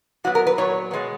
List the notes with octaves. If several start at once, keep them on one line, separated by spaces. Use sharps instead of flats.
A#2 F#3 B3 F#4
A#4
B4
A#2 F#3 B3 C#5
B2 G#3 B3